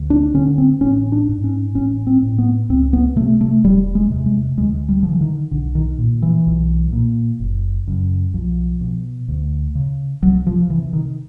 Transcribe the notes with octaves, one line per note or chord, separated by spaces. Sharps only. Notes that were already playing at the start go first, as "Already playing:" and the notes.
Already playing: D2
D4
D3 C#4
C4
A1 C#4
D4
G#2
C#4
A1 C#4
C4
A2
B3
C#2 C4
B3
C3 A3
A3
E1 G3
G#3
E2 C3
G#3
D2 G#3
G3
D3 F3
E3
D#3
B1 D3
D#3
A#2
E3
B1
A#2
F#1
F#2 C#3
B1 F3
B2
D2
C#3
C2 F#3
F3
C3 E3
D#3